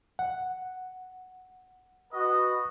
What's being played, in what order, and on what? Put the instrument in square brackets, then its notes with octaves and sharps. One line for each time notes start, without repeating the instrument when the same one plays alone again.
[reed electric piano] F#5
[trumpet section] F#4 B4 D#5